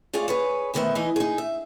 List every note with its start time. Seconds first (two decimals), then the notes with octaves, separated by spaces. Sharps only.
0.13 F4 G#4 C#5 D5 F5
0.28 G#4 B4 C#5
0.74 D2 B2 D#3 B3 C5 E5
0.95 E3 D#4 G#4 D#5
1.16 D#4 G#4
1.38 E5